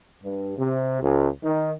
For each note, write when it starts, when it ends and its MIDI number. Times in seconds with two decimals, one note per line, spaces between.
0.24 0.55 43
0.58 1.00 48
1.02 1.28 37
1.43 1.73 51